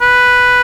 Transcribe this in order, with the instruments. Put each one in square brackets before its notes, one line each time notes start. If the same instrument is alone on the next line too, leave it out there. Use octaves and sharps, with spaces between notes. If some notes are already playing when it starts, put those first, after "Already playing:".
[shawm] B4